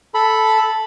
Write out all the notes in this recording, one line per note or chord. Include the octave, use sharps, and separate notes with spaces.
A4 B5